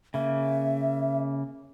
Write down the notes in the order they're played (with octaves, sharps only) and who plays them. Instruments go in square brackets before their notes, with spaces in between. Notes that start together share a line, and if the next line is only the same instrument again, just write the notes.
[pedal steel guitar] C#3 A#3 [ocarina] E5